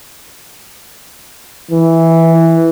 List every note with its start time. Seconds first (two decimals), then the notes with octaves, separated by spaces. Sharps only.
1.71 E3